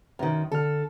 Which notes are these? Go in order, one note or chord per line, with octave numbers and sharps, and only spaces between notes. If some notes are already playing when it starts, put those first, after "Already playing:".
F#2 D#3
D3 A4 F6